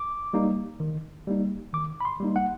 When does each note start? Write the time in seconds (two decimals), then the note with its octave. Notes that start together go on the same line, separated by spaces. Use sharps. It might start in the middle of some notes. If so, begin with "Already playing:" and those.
Already playing: D6
0.33 G3 A#3 D#4
0.80 D#3
1.27 G3 A#3 D#4
1.73 D#3 D6
2.00 B5
2.05 C6
2.20 G3 A#3 D#4
2.36 F#5